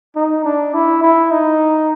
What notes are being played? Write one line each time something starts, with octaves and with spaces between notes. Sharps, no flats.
D#4
D4
E4
E4
D#4